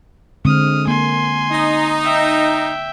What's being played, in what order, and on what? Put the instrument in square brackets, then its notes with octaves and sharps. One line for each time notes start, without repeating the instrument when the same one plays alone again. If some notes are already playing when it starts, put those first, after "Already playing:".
[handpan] D3 G#3 C4 [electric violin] D#6 F6
[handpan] A#3 [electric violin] G#5 C6
[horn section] D#4
[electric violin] E5 G5